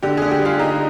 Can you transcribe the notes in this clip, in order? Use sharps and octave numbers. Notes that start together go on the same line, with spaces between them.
D3 G4
G#4
D3
G4
G3 F4
D3 D#4